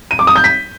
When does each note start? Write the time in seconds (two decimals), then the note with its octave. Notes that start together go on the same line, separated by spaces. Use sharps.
0.11 D#7
0.19 D6
0.27 D#6
0.36 G6
0.44 B6